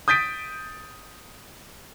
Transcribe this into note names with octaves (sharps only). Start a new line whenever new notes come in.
D#6 G6 A6 B6 D7